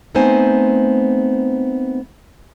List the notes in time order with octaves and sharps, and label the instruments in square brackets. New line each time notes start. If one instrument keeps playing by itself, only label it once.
[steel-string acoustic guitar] A3 B3 C4 D#4 C5 G#5